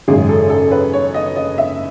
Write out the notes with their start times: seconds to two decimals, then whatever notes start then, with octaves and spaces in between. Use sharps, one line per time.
0.08 G#1 F#2 C#3 G#3 G#4
0.29 A4
0.50 A4
0.71 B4
0.93 C#5
1.14 D#5
1.36 D#5
1.58 E5